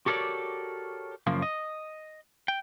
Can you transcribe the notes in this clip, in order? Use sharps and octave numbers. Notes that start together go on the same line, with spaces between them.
F#4 G4 A4 A#4 C#5 D5
F#2 C#3 F3 A#3
D#5
G5